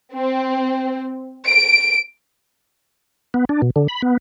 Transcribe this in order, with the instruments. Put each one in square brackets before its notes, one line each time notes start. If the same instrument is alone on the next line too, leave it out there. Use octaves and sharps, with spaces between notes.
[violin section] C4
D7
[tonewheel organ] B3
D4
B2
D3
B5
B3